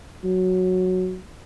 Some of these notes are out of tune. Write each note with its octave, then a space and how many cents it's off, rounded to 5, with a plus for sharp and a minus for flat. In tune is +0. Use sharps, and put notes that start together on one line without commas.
F#3 -5